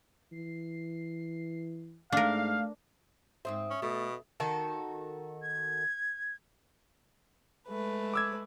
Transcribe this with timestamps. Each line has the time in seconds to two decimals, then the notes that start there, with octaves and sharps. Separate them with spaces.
0.32 E3 C7
2.12 G#2 A3 D4 A#4 F5
3.45 G#2 C4 C5 E5 D#6
3.70 C#4
3.82 B2 A3
4.40 D#3 F#4 A4
5.42 G#6
7.69 G#3 A3 B4
8.14 D6 E6 G#6